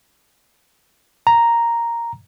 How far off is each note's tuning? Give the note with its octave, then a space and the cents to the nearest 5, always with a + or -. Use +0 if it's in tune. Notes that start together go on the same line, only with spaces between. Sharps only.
A#5 +0